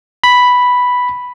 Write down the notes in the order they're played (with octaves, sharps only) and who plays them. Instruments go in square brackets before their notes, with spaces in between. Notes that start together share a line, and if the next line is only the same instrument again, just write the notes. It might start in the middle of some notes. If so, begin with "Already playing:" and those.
[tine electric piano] B5